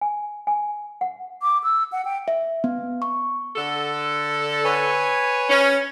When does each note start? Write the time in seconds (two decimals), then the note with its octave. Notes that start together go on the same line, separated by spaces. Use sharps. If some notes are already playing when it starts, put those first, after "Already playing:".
0.01 G#5
0.47 G#5
1.01 F#5
1.42 D6
1.64 E6
1.92 F#5
2.05 G5
2.28 E5
2.64 B3
3.02 C#6
3.56 D3 A4
4.65 B4 C#5 G#5
5.50 C#4